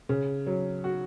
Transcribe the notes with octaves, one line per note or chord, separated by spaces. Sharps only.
C#3
F#3
F#4